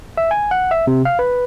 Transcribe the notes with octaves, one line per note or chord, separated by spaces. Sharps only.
E5
G#5
F#5
E5
C3
F5
B4